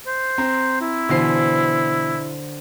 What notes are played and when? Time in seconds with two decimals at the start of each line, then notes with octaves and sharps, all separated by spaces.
0.07 C5
0.38 C4 A#5 C6
0.81 E4
1.09 B2 D3 E3 C5 C7